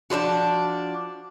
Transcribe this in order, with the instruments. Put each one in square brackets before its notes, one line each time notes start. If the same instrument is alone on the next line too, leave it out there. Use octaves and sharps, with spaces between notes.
[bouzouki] F3 D4 F4 F#4